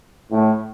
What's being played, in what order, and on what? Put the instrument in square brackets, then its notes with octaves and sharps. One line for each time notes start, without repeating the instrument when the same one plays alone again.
[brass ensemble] A2